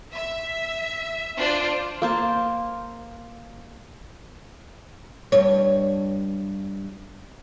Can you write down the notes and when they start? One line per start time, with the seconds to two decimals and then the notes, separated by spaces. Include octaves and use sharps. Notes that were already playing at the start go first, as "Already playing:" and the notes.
0.13 E5
1.37 D4 F4 C5 D5 D7
2.02 A#3 C5 A5
5.32 G2 C#5